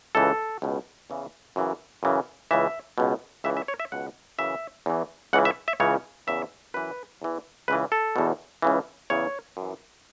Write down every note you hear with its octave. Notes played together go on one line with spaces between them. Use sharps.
C#2 C#3 E3 A4
C#2 B2
E2 C#3 E3
F#2 C#3 E3
F#2 C#3 E3
C#2 C#3 E3 E5
C#2 B2
C#2 C#3 E3 E5
E5
C#5
E5
C#2 B2 F#5
F#2 C#3 E3 E5
E2 E3
C#2 C#3 E3 F#5
E5
E5
C#2 C#3 E3 C#5
E2 C#3 E3 E5
F#2 E3 B4
E2 E3
C#2 C#3 E3 B4
A4
E2 B2
C#2 C#3 E3
E2 C#3 E3 C#5
F#2 E3